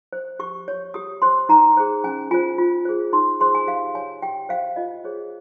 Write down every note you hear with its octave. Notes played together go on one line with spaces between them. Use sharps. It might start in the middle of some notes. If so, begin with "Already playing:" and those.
C5
G4 C#6
C#5
G4 D#6
C5 C6
D#4 A#5
G#4 C5
C#4 G#5
F4 C5 G#5
F4
G#4 C5
D#4 C6
G#4 C5 C6
G#5
G4 F5
C#5 G#5
G4 G5
C5 F5
F4 D#5
G#4 C5 C#5